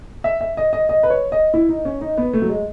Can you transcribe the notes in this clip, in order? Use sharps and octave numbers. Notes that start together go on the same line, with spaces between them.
E5
E5
D#5
D#5
D#5
B4
C#5
D#5
E4
D#4
C#4
D#4
B3
A3
F#3
G#3